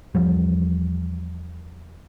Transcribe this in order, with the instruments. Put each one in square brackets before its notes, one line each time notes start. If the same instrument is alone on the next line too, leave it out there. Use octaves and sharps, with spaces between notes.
[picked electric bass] E2 F3 G3